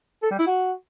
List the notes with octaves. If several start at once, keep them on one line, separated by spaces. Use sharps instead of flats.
A4
G3
E4
F#4